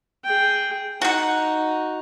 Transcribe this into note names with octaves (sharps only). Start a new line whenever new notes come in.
G#4 G5
D#4 F#4 F#5